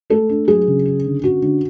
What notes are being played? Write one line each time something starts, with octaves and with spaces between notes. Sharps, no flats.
A3 A4
D4
F#3 G#4
C#3
C#4
D3
C#4 F#4
D3